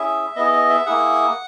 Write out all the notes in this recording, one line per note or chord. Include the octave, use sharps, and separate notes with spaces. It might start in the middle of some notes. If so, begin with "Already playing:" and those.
Already playing: C#4 E4 G#4 E5
B3 E4 G#4 D#5
D#5
E5
A#3 E4 G#4 F#5